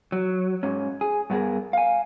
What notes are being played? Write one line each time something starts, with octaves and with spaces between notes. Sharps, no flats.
F#3
G#2 C#4
G#4
G2 B3 C4 G#4 A#4
F5 G#5